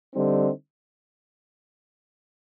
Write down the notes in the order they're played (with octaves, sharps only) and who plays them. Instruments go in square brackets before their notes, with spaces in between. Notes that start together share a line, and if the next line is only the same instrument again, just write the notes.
[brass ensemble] D3 G3 C4 D#4